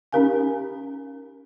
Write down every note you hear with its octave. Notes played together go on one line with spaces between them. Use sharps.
C#4 D#4 G4 A#4 F5 G#5